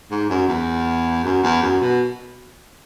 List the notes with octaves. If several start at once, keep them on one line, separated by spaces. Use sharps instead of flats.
G#2
F#2
E2
F#2
E2
F#2
B2